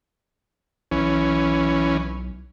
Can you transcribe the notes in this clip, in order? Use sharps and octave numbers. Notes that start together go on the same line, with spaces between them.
B1 E3 C#4